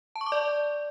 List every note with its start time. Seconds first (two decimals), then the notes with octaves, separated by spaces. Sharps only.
0.16 A5
0.21 C#6
0.26 D6
0.32 D5